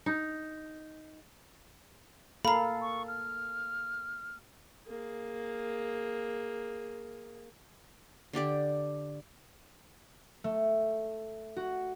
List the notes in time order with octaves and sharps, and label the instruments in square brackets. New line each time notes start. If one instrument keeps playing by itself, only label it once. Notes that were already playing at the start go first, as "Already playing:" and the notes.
[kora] D#4
[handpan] A#3 A4 F5 [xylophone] A#5 B5
[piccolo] C#6
F6
[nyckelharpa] A#3 G#4
[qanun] D3 D4 G4 D5
[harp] A3
F#4